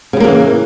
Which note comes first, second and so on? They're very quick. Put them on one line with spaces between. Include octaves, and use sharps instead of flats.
C#3 G3 A#3 F#3 E3